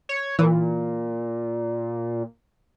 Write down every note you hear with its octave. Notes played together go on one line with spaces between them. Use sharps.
C#5
A#2 E3